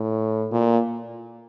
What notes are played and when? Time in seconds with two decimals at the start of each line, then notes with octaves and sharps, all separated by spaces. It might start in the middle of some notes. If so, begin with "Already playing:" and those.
Already playing: A2
0.52 A#2